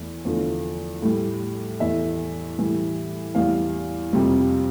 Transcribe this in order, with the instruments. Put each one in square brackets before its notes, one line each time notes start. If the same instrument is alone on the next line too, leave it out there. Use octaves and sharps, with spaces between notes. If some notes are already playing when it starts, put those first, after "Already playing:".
Already playing: [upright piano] E2 E3 A3
E2 D3 F3 A3
A2 G3
E2 E3 A3 E5
A2 E3 G3
E2 E3 G3 F5
F2 C3 G3